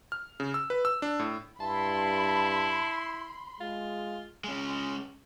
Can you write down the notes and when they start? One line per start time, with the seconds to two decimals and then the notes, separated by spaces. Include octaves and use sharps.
0.12 F6
0.40 C#3
0.54 E6
0.70 B4
0.85 E6
1.02 D4
1.19 A2
1.60 G2 E4 A5 B5 C6
3.61 G#3 F4
4.44 G#3 C#4